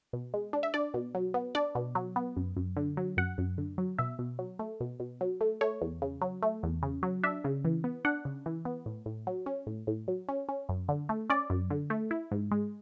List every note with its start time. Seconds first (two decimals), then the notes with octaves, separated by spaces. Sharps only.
0.13 B2
0.34 G#3
0.53 D4
0.63 E5
0.74 D4 D5
0.94 B2
1.15 F#3
1.34 B3
1.55 D4 D5
1.75 B2
1.95 F#3
2.16 B3
2.37 F#2
2.57 F#2
2.77 D3
2.97 F#3
3.17 F#2 F#5
3.38 F#2
3.58 D3
3.78 F#3
3.98 B2 E5
4.19 B2
4.39 F#3
4.59 A3
4.80 B2
5.00 B2
5.21 F#3
5.41 A3
5.61 A3 C#5
5.82 E2
6.02 C#3
6.22 F#3
6.42 A3
6.63 E2
6.83 C#3
7.03 F#3
7.23 D4 E5
7.44 C#3
7.65 E3
7.84 B3
8.05 D4 F#5
8.25 C#3
8.46 E3
8.65 B3
8.86 A2
9.06 A2
9.27 F#3
9.46 C#4
9.67 A2
9.87 A2
10.08 F#3
10.29 C#4
10.49 C#4
10.69 F#2
10.89 D3
11.09 A3
11.30 C#4 D5
11.50 F#2
11.70 D3
11.90 A3
12.11 E4
12.31 G#2
12.51 G#3